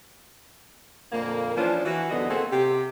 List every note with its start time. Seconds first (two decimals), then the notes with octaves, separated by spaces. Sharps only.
1.12 F2 A#2 D3 A#3
1.57 E3 F3 C#4 D4 F4 C5
1.85 E3 F#4
2.11 D#2 B2 D3 F#3 B3 D#5
2.29 A3 A#3 C4 F#4 G#4 A4
2.52 C3 G4